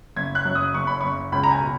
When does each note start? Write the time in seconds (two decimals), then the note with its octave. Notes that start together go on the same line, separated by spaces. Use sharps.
0.16 F#1 G#6
0.35 F#6
0.45 F#2
0.55 D#6
0.74 F#1 C#6
0.87 B5
1.01 F#1 C#6
1.32 C#2 B5
1.43 A#5
1.51 G#5
1.61 B2